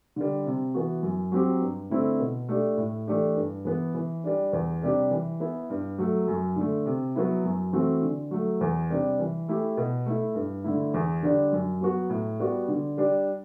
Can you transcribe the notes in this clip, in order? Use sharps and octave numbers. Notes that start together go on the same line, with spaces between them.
D3 G3
C3
E3 B3 F#4
F#2
F#3 C4 G4
G2
D3 A3 C4 E4
B2
A3 D4 G4
A2
E3 A3 D4 G4
G2
E3 B3
E3
G3 D4
E2
C3 G3 D4 G4
E3
B3 E4
G2
F#3 A3
F#2
D3 A3
C3
F#3 B3 E4
F#2
E3 A3 C4 F#4
D3
F#3 A3
E2
C3 G3 D4
E3
A3 E4 G4
B2
A3 E4
G2
D3 A3 E4
E2
D3 G3 D4
F#2
F#3 B3 F#4
A2
G3 B3 F#4
D3
G3 D4 G4